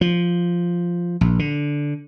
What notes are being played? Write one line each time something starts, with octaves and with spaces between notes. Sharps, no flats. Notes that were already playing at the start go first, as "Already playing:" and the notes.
F3
A#1
D3